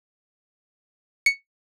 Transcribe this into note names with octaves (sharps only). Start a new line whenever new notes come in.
C#7